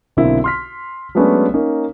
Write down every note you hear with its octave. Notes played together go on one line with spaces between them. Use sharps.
B1 D3 A#3 C4 E4
C6 F6 B6
F#3 G#3 A3 B3 C#4 D4
A#3 C#4 D#4